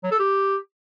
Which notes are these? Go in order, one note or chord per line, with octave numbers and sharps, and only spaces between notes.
F#3
A4
G4